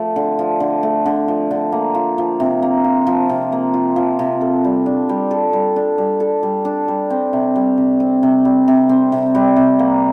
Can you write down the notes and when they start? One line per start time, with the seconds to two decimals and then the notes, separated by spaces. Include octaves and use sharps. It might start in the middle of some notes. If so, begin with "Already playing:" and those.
Already playing: F3 A3
0.16 D3
0.39 F3
0.60 D3
0.83 A3
1.06 D3
1.28 F3
1.51 D3
1.72 A#3
1.95 F4
2.18 F3
2.40 C3
2.62 A#3
2.84 F4
3.07 F3
3.29 C3
3.52 A#3
3.74 F4
3.96 F3
4.19 C3
4.41 A4
4.64 G3
4.86 D4
5.09 G3
5.31 A4
5.53 G3
5.76 D4
5.98 G3
6.20 A4
6.43 G3
6.65 D4
6.88 G3
7.10 C4
7.33 C3
7.56 G3
7.77 C3
8.00 C4
8.23 C3
8.45 G3
8.68 C3
8.89 C4
9.12 C3
9.35 G3
9.56 C3
9.79 A#3